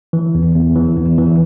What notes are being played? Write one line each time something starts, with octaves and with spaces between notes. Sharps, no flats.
E3
E2
E2
E3
E2
E3